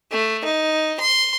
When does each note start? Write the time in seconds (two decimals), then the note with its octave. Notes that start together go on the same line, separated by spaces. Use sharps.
0.11 A3
0.44 D#4
1.00 C6